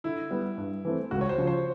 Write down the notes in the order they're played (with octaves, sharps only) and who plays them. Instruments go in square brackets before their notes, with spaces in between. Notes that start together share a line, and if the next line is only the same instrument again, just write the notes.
[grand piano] D3 [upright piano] E4
[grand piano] G3 B3
G2
E3 A3 C4
[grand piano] C#2 [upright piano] F#4
[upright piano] C#5
C5
[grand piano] C#3 F3
[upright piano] C5